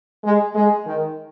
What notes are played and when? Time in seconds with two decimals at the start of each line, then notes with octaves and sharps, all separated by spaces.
0.24 G#3
0.55 G#3
0.86 D#3